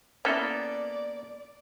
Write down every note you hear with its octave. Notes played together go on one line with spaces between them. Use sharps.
A#3 B3 C#4 E4 A4 D5